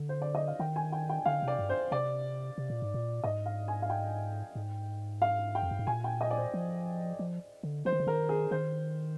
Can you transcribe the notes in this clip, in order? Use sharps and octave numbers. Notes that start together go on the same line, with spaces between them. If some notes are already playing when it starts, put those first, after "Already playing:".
Already playing: D3
C5
D5
D#5
F5
D#3 G5
G#5
G5
G5
D3 F5
C3
D5
G2
C5
C3 D5
C3
A#2
G#2
A#2
G#2 D#5
F5
G#5
F5
G5
G#2
F5
G5
F2
G2
G#2
A#2 G#5
G5
D#5
D5
C5
F3
F3
D3
F3 C5
D#3
D3
D#3 A#4
G#4
D#3 C5